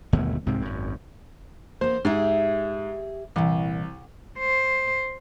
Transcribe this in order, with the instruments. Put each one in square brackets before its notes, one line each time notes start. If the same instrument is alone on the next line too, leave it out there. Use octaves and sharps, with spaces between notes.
[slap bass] G1 D#2 B2 A3
C2 G#2 C3 C4
G#1 F#2
[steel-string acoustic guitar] A#3 B3 [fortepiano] C5
[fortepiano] G#2 [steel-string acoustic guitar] G4 G#4 E5
[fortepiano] C2 [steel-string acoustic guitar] A#2 E3
[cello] C5